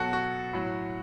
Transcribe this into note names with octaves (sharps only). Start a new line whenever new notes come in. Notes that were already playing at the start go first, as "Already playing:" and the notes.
Already playing: B2 F#3 F#4 A4
F#4
A2 F#3